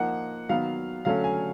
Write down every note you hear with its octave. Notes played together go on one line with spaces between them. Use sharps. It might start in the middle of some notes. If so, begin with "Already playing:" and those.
Already playing: F3 A#3 D#4 F#5
D#3 F#3 B3 F5
D3 F#3 A3 C#4 F5
G#5